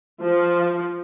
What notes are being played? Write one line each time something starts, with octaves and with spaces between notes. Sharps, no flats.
F3